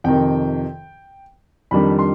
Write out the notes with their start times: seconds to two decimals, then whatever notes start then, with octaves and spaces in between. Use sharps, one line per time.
0.04 F2 C3 D#3 G5
1.71 F2 D#3 G3 D4 B5
1.99 C6